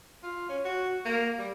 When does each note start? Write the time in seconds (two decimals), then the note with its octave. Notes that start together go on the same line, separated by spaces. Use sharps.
0.23 F4
0.49 C#4
0.65 F#4
1.05 A#3
1.38 G3